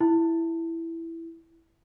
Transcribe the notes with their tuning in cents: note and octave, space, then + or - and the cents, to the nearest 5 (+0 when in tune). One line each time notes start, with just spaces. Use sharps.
E4 +5